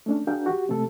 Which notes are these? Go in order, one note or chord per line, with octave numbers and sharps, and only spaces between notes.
A3 C#4 D4
D4 F#4 G#4 A#4 F5 G5
F#4 G4
C3 A3 A4